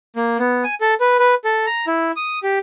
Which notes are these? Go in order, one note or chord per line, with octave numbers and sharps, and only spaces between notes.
A#3
B3
G#5
A4
B4
B4
A4
A#5
E4
D#6
G4